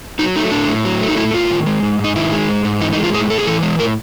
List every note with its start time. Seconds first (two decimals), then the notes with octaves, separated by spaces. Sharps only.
0.19 F#3 D#4
0.36 A3 D#4
0.51 A2 D4
0.68 A2
0.85 F#3
1.01 A3
1.08 D#4
1.17 A2 E4
1.33 A2 F4
1.51 D#3
1.66 G#3
1.83 G#2
1.99 G#2 D#4
2.16 D#3 E4
2.32 G#3
2.48 G#2
2.65 G#2
2.81 E3 D#4
2.93 D#4
2.97 G#3
3.04 F4
3.13 A2 G#4
3.30 A2 A4
3.38 G#4
3.46 E3 A4
3.63 G#3
3.79 A2 A#4